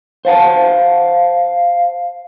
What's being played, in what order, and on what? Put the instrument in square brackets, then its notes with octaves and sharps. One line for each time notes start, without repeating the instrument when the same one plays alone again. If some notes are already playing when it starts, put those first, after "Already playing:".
[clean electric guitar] C5 F#5 A5 [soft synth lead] F5